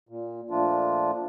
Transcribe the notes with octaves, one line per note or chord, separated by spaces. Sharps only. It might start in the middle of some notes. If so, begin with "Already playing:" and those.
A#2
A#2 F3 A3 D4 F4